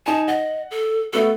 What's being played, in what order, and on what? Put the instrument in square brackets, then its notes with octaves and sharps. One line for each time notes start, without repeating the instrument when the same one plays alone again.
[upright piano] D#4 G#5 [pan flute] A5
[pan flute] D#5 [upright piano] F#5
[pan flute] A4
[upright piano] A3 B3 F#4 [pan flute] A4